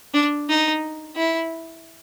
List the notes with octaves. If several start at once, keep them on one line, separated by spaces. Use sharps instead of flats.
D4
D#4
E4